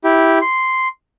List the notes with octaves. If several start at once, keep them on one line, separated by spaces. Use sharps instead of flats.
E4 G4
C6